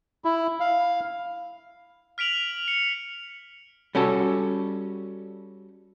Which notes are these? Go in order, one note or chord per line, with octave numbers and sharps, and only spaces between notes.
E4
F5
F6 B6 D7 F7 F#7
C#7
G3 C#4 F#4 A4